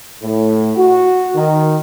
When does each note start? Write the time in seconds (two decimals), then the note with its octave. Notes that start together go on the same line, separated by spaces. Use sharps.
0.23 A2
0.77 F#4
1.35 D#3